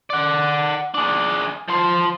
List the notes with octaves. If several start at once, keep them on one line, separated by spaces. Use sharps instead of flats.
D5 F#5
D4 G#4
F3 C5